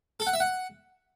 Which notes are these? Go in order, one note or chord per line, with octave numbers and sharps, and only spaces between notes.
A4
F#5
E5
F#5